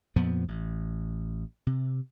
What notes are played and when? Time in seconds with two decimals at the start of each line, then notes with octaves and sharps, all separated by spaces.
0.16 F2 A#2 F3 B3
0.48 A1
1.67 C3